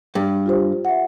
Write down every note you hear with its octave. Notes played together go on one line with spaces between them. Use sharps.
G2
F4 G4 C5
E5 F#5